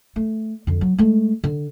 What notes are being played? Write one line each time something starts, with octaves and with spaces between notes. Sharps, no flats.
A3
F2 D3
F#3
G#3 A3
D3